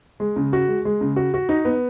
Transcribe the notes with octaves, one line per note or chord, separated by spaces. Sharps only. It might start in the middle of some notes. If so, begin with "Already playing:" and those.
G#3
C#3
F#4
G#3
G#3
C#3
F#4
F#4
D#4
B3